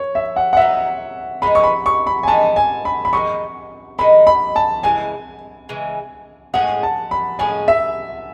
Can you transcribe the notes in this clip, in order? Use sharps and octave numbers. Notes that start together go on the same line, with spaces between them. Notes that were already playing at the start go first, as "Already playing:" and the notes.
Already playing: C#5
E5
F#5
F#5
F#3 B3 D#4 E5
E3 G#3 B3 D#4 B5
C#6
B5
C#6
B5
G#5
E3 G#3 B3 D#4 A5
G#5
B5
B5
D#3 G#3 D#4 C#6
D#3 G#3 D#4 B5
B5
A5
C#3 E3 G#3 G#5
C#3 E3 G#3
A2 G#3 C#4 G#4 F#5
A5
B5
A2 G#3 C#4 G#4 G#5
E5